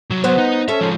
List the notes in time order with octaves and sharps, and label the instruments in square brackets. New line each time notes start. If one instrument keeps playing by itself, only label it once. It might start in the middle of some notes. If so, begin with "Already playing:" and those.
[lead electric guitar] C2 F#3
[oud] B3 C5
[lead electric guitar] D#4
[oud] C#4 A4 C#5 [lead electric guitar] E5
[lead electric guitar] F3 G#3